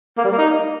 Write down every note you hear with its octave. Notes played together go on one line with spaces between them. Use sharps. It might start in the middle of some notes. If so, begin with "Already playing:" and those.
A#3
G3
A#3
D#4